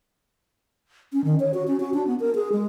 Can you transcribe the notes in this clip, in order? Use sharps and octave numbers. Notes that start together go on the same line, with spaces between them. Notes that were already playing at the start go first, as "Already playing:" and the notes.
C#4
D#3
C#5
F#4
C#4
F#4
D4
B3
A#4
G#4
G#3